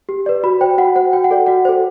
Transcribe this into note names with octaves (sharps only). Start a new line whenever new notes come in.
G4
B4 D5
F#4 B5
C5 G5
F#4 F#5
C5 F#5
F#4 G5
F#5
A4 D5
F#4 F#5
A4 C5